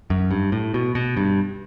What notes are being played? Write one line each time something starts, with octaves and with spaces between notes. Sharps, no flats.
F#2
G2
A2
B2
B2
G2